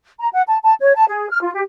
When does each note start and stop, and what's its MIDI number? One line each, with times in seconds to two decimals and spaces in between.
0.18 0.28 82
0.32 0.42 78
0.47 0.56 81
0.62 0.73 81
0.80 0.93 73
0.95 1.05 81
1.08 1.28 68
1.29 1.41 89
1.42 1.52 65
1.54 1.62 67